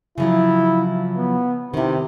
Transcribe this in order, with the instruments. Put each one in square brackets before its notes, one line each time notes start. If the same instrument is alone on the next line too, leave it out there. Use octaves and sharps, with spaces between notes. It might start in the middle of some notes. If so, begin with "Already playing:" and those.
[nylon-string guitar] C#3 F3 F#3 [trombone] E4
[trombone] B3
[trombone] C3 [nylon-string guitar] D#3 E4